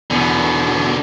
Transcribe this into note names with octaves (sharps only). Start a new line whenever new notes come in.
E2 B2 D3